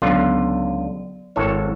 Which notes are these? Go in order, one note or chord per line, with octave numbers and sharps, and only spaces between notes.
C#2 D3 F#3 B3 F4 D5
G#1 E4 A4 C#5